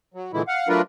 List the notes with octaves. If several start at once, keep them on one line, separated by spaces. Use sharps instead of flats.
F#3
A#2 D3 E3 G#3 E4
F5 F#5
F#3 A3 D4 F4 A#4 B4